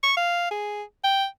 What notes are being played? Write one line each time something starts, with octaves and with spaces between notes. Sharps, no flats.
C#6
F5
G#4
G5